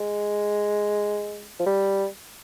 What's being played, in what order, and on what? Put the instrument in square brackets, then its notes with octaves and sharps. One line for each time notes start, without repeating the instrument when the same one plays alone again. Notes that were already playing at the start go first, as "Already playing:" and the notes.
Already playing: [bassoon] G#3
F3
G3